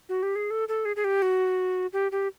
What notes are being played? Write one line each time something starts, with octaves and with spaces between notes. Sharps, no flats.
F#4
G4
G#4
A4
A4
G#4
G#4
G4
F#4
G4
G4